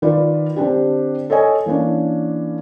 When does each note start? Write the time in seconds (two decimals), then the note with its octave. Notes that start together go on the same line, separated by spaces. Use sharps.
0.02 D#3 F4 B4 D5
0.56 D3 C4 D4 G4
1.30 A4 C#5 D#5 G#5
1.66 E3 A#3 C#4 D4